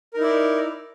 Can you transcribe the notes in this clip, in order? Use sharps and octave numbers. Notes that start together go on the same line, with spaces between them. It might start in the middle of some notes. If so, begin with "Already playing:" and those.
D#4 E4 A#4 D5